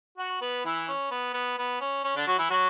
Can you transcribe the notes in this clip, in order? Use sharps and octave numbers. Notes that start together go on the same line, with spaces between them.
F#4 F#5
B3 B4
E3 E4
C#4
B3
B3
B3
C#4
C#4
D3 D4
F#3 F#4
E3 E4
F#3 F#4